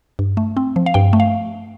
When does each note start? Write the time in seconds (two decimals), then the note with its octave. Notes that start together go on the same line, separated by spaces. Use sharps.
0.19 G2
0.37 A3
0.57 C4
0.76 F3
0.86 F5
0.94 G2 G5
1.13 A3
1.20 F5